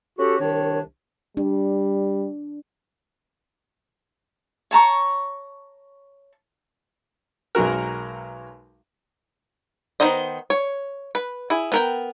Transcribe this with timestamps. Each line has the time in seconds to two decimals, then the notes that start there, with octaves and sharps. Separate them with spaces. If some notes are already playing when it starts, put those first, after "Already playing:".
0.18 C#4 F#4 G4 A4
0.39 C2 D#3 D4 C#5
1.37 G3 D4
4.71 C#5 A5 A#5 C#6
7.55 B1 F#3 G#3 F#4 A#4
10.00 D#3 B3 D#4 C5 D#5
10.50 C#5
11.15 B4
11.50 E4 G#4
11.72 B3 A#4 G5